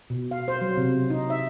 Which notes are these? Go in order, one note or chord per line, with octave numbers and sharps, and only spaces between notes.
B2
F5
C5
F#3
C3
D#4
E5